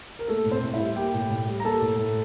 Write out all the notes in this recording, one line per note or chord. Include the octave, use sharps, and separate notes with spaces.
A#4
A3 A#3 A4
A2
C4 C5
A2
E4 E5
G3
A#3 G4 G5
A2
A2
G3
A#5
A#3 A4 A5
A2
A2